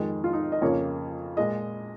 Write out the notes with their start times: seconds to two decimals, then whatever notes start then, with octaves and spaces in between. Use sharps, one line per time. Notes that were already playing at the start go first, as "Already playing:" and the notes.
Already playing: F2 D#3 G#3 D#5
0.24 F4
0.33 D#4
0.52 D#5
0.62 F2 C#3 A#3 C#5
1.37 A#2 G#3 D#5